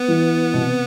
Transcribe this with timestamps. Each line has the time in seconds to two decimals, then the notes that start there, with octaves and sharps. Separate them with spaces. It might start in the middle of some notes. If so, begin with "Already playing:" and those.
Already playing: B3
0.08 E3
0.54 B2
0.58 C3